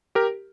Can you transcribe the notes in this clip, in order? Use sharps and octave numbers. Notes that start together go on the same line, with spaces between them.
G4 A#4